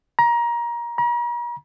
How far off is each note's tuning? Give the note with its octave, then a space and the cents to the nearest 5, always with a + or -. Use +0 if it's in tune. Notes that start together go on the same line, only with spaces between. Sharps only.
A#5 +25
A#5 +45